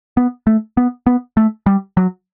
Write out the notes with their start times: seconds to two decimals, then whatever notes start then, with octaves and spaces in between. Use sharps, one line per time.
0.17 B3
0.47 A3
0.77 B3
1.06 B3
1.37 A3
1.66 G3
1.97 F#3